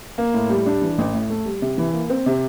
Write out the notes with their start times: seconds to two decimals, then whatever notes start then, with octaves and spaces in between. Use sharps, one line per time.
0.18 A#3
0.34 A2
0.50 G3
0.66 D4
0.82 E3
0.98 A1
1.14 A2
1.30 A3
1.46 G3
1.62 C3
1.78 E3
1.94 A#3
2.10 C4
2.26 C3